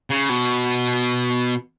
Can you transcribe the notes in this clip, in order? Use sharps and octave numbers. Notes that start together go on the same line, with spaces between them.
C#3
B2